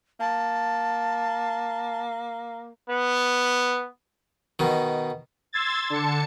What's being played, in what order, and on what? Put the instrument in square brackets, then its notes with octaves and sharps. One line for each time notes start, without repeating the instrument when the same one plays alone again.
[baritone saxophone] A#3 [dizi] A5
[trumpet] B3
[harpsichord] B2 D#3
[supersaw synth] C6 E6 G#6 A6
D3 A5 C#7